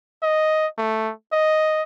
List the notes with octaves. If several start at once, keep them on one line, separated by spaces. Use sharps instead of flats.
D#5
A3
D#5